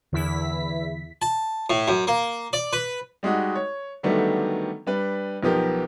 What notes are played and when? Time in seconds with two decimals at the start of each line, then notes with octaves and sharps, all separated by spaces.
0.13 E2 D3 E3 E4 B6
1.22 A5
1.70 A2
1.88 F#2
2.07 A#3
2.53 D5
2.73 B4
3.23 G3 G#3 D#4 F#4
3.55 C#5
4.03 D3 D#3 F#3 G3 A3 B3
4.87 G3 D4 B4
5.43 B1 F3 B3 G4 A#4